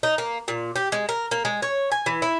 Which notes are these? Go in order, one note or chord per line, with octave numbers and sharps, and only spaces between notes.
D#4
A#3
A#2
G4
G#3
A#4
A#3
G#3
C#5
G#5
E3
E4